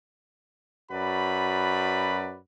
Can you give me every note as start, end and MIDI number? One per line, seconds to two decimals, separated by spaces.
0.91 2.38 42
0.91 2.38 66
0.91 2.38 71
0.91 2.38 74
0.91 2.38 83